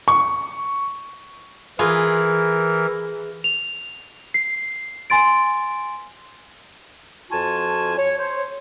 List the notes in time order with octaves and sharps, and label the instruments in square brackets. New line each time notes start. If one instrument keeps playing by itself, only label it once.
[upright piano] C#6
[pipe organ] E3 A#4 [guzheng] F4 G#4 B4
[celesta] F7
C7
G#5 C6 A6 D7
[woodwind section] F2 F4 F#4 G#5 A5
C#5
C5 C#5